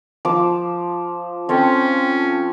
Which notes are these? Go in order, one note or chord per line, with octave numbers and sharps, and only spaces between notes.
F3 D6
C4 C#4 A4 G5